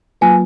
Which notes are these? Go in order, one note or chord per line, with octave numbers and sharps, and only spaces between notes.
F#3 A#3 F4 B4 G#5